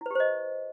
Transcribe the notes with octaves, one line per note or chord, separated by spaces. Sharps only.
E4 G4 B4 C5 D#5